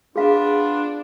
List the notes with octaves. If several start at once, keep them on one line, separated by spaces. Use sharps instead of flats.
B3 D4 F4 G#4 F5